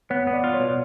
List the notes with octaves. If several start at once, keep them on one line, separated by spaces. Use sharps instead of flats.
B3 C#5
B3
D5
F4
C#5
B2